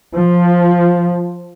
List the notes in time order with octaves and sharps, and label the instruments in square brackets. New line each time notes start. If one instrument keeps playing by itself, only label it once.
[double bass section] F3